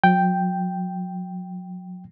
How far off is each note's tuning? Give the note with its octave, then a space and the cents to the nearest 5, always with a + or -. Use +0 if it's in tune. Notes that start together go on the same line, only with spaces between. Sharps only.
F#3 -35 G5 +0